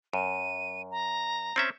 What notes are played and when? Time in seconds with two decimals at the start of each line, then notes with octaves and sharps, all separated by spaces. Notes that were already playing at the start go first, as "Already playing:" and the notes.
0.13 F#2 D#7
0.91 A#5
1.56 C4 C#4 E5